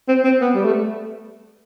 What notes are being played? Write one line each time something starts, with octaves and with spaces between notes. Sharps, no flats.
C4
C4
B3
G3
A3